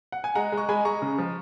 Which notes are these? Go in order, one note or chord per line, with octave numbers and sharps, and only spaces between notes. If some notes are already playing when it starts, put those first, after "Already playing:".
F#5
G#5
G#3 F#5 A#5
G#3
C#6
G#3 G#5 B5
G#3 A#5 C#6
C#3
F3